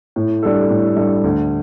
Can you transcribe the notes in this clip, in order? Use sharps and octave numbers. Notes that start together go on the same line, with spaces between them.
A2
G3 D4 A4
A2
G3 D4 A4
D2